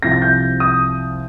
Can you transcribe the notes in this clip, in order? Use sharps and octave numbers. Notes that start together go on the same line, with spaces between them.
C2 C3 F3 A#6
A6
G6
D#6